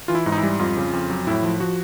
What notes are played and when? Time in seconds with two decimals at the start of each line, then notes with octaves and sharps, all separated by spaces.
0.08 E3 F4
0.15 E4
0.26 G#2
0.32 D#4
0.38 E4
0.43 G3
0.59 F2 F4
0.77 C#3
0.93 F2
1.10 F#3
1.27 A2 E4
1.43 F3
1.60 F3 F#4